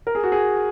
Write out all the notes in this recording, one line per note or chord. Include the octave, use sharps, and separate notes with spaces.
A#4
G#4
F#4
G#4